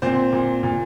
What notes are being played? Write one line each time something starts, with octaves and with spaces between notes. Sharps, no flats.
A#2 C4 C5
A#2
A#2